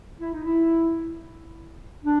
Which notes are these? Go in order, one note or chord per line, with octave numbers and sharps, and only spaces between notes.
E4
D#4
E4
D4